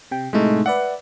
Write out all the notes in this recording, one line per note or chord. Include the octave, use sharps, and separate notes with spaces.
C3 G5
A2 C3 G#3 A3 D#4
B4 D5 E5 F#5